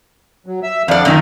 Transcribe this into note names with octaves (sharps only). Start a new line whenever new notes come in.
F#3
E5 E6
F2 D4 D5 F5 F#5
F#2 A#2 D#3 C4